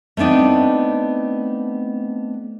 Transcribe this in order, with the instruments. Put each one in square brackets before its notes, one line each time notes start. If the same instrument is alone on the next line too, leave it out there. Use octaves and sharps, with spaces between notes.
[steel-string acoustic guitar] A3 B3 C4 D4 D#4